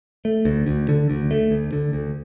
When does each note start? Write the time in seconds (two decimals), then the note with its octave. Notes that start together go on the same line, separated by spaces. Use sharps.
0.25 A3
0.45 D2
0.67 D2
0.89 D3
1.10 D2
1.31 A3
1.51 D2
1.72 D3
1.93 D2